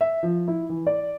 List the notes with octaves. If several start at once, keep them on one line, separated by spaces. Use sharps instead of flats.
E5
F3
E4
E3
D5